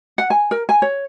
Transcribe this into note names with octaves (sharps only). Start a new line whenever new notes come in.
F#5
G#5
A#4
G#5
C#5